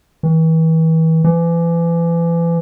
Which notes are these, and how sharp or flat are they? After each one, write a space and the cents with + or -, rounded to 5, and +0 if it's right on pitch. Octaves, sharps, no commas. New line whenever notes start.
E3 -35
E3 +35